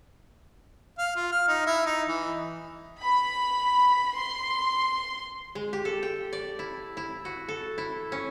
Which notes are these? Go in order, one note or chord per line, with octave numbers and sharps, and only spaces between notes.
F5
F4
F6
D#4
E4
D#4
E3
B5
C6
G#3
G4
A4
G5
D5
E4
E4
F#4
A4
E4
C#4